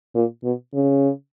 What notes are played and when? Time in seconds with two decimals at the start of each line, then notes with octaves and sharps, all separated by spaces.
0.15 A#2
0.44 B2
0.74 C#3